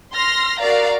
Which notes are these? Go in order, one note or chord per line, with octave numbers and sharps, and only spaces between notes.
C6 F6 A#6
F#4 A#4 D5 F5 A#5